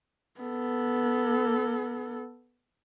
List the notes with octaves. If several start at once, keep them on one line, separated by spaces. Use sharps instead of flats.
B3 A4